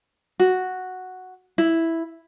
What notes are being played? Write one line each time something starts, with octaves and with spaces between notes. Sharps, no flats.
F#4
E4